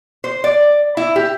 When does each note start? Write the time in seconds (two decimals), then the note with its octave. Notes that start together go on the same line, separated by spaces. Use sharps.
0.24 C5
0.44 D5
0.97 E4
1.16 G4